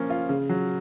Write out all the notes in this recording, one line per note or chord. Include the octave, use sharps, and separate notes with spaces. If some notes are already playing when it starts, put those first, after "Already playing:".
Already playing: F3 A#3 C#4
F4
C#3
F#3